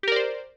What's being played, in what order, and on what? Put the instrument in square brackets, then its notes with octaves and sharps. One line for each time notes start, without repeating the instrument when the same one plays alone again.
[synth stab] G4
A#4
D5
C5